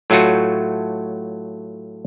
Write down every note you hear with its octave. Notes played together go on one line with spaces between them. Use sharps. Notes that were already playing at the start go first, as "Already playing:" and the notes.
A2 F#3 A3 F4 F#4